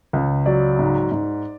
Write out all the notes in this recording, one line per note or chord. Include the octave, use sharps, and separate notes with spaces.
C#2
F#3 D5
G#2
G#2